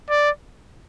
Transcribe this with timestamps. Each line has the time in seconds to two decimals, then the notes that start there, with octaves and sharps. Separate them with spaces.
0.10 D5